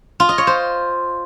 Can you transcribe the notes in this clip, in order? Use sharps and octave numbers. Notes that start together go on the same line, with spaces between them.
F4
D#5
C#5
C5